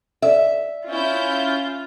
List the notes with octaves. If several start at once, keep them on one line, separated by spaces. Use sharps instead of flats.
A4 D5 E5
C#4 E4 F4 G6